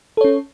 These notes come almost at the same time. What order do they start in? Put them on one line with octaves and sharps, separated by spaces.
A4 C#5 C#4